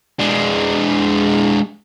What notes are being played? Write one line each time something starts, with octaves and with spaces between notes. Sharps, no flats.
G#3 D4